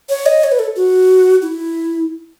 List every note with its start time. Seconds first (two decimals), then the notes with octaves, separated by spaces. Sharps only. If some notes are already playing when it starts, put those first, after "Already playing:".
0.09 C#5
0.26 D#5
0.44 C#5
0.52 B4
0.59 A4
0.76 F#4
1.42 E4